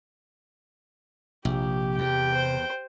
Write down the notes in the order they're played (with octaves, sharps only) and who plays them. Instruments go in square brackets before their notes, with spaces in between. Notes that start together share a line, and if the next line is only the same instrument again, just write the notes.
[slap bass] A#1 [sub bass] C3 [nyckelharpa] G4
[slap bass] E2 [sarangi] G5
[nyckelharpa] C5